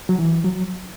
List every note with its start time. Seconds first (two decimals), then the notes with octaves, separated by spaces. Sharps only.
0.09 F#3
0.19 E3
0.45 F#3